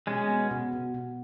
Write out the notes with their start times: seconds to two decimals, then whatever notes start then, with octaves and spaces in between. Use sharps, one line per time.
0.07 B2 G#3 C#4
0.29 B3
0.51 B2
0.73 B2
0.94 B2